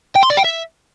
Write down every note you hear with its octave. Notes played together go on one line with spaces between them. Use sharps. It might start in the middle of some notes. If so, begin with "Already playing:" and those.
G5
C6
D5
G5
E5